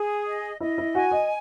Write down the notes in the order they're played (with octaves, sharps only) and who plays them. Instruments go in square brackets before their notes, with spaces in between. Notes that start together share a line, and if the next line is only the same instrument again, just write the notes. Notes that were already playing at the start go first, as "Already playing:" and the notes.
Already playing: [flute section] G#4
D#5
[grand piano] E4 [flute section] D#5
[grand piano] E4
[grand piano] F#4 [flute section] G#5
[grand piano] D#5